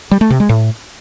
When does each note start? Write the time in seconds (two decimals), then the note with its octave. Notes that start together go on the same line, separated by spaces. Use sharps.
0.11 G3
0.21 A3
0.30 C3
0.40 G#3
0.49 A2